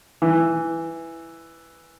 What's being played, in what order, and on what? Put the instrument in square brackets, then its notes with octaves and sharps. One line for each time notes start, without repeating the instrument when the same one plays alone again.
[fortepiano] E3